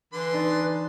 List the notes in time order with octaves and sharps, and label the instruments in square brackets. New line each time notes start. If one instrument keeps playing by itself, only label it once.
[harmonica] D3 C6 [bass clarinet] E3 [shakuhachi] B4
[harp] D4 D#4 A6